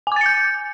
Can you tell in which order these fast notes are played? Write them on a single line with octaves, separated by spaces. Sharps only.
G#5 D6 A6 C#7 G6